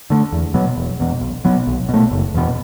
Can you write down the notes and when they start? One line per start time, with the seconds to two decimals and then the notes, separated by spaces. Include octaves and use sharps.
0.10 D3 A3
0.33 E2
0.54 B2 F#3 B3
0.78 E1
1.00 E2 B2
1.21 B1
1.45 B2 F#3 B3
1.67 B1
1.89 B2 A3
2.11 F#1
2.35 E2 B2 B3